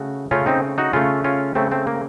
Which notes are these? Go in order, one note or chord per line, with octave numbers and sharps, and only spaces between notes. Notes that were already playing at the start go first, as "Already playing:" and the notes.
Already playing: C#3 A3 F#4
C#3 A3 C#4 F4
C4 D#4
D#4 F#4
C#3 A3 C#4 F4
C#4 F4
C#3 A3 C4
A3 C4
A#3